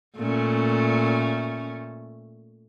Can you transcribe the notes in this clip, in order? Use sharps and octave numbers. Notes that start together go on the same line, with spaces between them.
A#2 A3 C#4